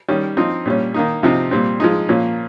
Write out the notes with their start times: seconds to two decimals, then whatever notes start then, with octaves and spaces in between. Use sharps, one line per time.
0.08 D#3 G3 C#4
0.37 F3 C4 D#4
0.66 A#2 G3 C#4
0.94 D#3 A#3 D#4
1.23 C3 F3 C4 D#4
1.51 A#2 G3 C4
1.80 F3 G#3 D#4
2.09 A#2 F3 A#3 C#4